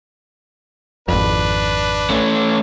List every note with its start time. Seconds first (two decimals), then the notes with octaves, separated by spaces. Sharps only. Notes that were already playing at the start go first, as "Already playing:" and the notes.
1.08 G#1 F2 D4 B4
2.10 A3 C#4